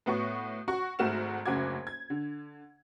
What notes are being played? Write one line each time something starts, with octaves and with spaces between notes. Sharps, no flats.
A2 B3 F#4 C#5 C#6
F#4 F#5 C#6
G#1 G#2 A3 F#4 F6 E7
F#1 D2 C#3 F#4 D6 G#6
G#6
D3